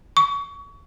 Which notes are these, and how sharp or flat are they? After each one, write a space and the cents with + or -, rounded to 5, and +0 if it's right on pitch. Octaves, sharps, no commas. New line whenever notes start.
C#6 +30